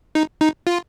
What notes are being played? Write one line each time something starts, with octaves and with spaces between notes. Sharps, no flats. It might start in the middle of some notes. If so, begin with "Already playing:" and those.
D#4
D#4
F4